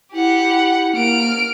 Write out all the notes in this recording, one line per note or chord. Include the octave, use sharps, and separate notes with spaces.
E4 G4 F#5
A#3 F6 D7